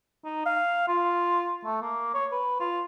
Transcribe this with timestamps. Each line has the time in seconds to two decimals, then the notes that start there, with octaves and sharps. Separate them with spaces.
0.25 D#4
0.46 F5
0.88 F4
1.64 A3
1.82 A#3
2.14 C#5
2.32 B4
2.60 F4